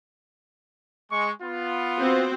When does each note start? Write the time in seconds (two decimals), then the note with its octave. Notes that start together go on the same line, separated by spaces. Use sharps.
1.11 G#3 C#6
1.43 B3 F4
1.97 C4 F#4 C5